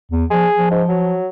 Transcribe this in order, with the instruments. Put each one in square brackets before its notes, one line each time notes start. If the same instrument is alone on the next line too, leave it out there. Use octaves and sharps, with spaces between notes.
[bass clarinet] E2
[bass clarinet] F3 [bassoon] G#4
[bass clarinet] F3
[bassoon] G#2
F#3